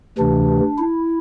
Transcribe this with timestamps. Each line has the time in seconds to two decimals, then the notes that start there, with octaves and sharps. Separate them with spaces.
0.18 D2 C3 E3 D4
0.78 E4